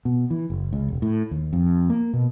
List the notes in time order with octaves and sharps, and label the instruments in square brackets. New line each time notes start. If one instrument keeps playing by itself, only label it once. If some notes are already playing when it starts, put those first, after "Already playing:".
[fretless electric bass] B2
E3
F#1
C#2
E1
A2
D#2
F2
A#3
B2